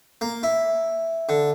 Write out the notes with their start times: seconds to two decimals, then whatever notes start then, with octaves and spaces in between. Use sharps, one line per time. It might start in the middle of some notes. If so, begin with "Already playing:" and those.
0.21 A#3
0.43 E4
1.29 D3